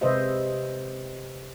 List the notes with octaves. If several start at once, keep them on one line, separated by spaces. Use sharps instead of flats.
C3 G#3 B4 C5 D#5 E5